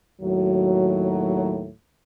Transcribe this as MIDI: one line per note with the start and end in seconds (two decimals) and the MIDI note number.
0.22 1.70 39
0.22 1.70 45
0.22 1.70 54